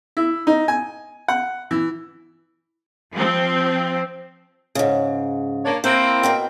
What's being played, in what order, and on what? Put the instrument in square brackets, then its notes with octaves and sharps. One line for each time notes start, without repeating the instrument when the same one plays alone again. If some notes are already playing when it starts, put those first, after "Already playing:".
[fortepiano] E4
D#4
G#5
F#5
E3
[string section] F3 C4
[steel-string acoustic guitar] G#2 C#3
[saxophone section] A#3 D4 C#5
[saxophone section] A#3 C4 [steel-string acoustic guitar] E4
[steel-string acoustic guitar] B2 A#4 G5